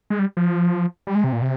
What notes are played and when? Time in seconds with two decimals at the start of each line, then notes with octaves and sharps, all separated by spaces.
0.10 G#3
0.19 G3
0.37 F3
1.07 G3
1.15 G#3
1.24 C3
1.33 A#2
1.42 C3